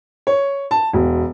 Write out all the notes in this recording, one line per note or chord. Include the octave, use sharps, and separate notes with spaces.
C#5
A5
E1